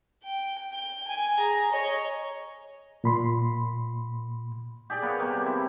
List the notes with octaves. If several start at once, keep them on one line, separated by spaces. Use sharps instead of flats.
G5
G5
G#5
G#4 A#5
C#5 D#5
A#2 B5 C6
G4 G#4 D5
A#3 B3 B4 C#5
C3 G3 A#3
C4 E4